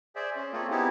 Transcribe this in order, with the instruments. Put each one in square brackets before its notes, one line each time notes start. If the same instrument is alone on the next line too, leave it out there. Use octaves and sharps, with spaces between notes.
[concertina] G#4 C5 D5 E5
C#4
A3 A#3 C4 F4 G#4 A4
B3 C4 D#4 E4 G4 G#4